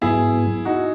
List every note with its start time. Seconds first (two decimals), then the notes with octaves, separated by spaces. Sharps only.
0.02 G#2 F#3 B3 E4 G#4
0.65 D#4 F#4